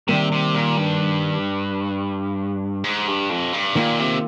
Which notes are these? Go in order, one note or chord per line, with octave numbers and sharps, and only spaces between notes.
C3 D#3 G3 A#3
C3
A#2
G2
G#2
G2
F2
G2
A#2 D#3 A#3 F4
C3